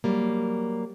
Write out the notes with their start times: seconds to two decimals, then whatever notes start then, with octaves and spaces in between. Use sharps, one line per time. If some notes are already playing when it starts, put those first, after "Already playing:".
0.04 F#3 G3 A#3